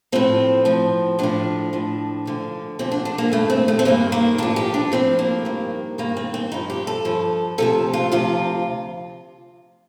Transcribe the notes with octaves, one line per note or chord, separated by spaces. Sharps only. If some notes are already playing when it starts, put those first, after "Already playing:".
A2 F3 C4
A2 F3
A2 F3 D4
A2 F3
D2 D3 F3
D2 D3 F3 C4
D4
D4
A#3
G2 D#3 A3
C4
A3
C4
G2 D#3 A#3
A#3
A2 F3 D4
G4
D4
A2 F3 C4
A#3
G2 D#3
G2 D#3 A#3
C4
C4
G2 F3 D#4
G4
A4
G2 F3
D2 C3 F3 A4
F4
D2 C3 F3 F4